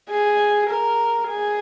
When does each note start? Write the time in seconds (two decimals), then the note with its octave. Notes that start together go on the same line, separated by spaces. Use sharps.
0.10 G#4
0.69 A#4
1.29 G#4